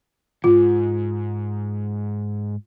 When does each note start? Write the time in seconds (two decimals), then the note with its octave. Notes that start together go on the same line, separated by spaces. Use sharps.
0.44 D#2 G#2 F4